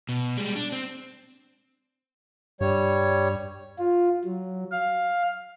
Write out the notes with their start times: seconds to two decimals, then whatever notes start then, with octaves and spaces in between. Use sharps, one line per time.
0.09 B2
0.37 G3 G#3
0.56 D4
0.72 C4
2.61 G2 G3 C#5
3.78 F4
4.24 F#3
4.72 F5